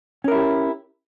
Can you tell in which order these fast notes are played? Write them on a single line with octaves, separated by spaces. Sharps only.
C#4 A#4 E4 G4